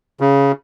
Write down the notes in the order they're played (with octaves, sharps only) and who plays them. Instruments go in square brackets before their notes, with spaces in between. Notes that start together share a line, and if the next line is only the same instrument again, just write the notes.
[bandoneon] C#3